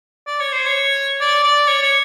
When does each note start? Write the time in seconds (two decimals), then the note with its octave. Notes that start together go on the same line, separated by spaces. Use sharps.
0.27 D5
0.40 C#5
0.52 C5
0.66 C#5
1.21 D5
1.44 D5
1.67 C#5
1.83 C#5